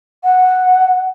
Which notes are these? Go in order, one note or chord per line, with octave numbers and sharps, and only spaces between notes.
F#5